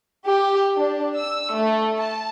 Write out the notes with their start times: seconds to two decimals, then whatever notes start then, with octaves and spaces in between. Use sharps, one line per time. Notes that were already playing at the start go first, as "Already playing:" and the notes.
0.25 G4
0.77 D4
1.18 E6
1.55 A3
1.98 A5